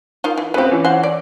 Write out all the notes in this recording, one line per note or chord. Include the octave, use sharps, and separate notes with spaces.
D#4 F4 A#4
E3
C#3 C4 G4 B4
E3 C#4
C5 F#5
D5